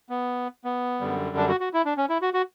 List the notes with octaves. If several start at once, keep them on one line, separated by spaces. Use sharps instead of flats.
B3
B3
F#2 D3 G3
D4
F#4
F#4
E4
D4
C#4
E4
F#4
F#4